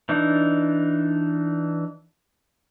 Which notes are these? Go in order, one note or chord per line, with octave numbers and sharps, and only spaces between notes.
E3 D4 D#4